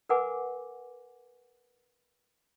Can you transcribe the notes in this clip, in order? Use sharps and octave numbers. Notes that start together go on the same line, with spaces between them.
A#4 B4 F#5 G#5 D6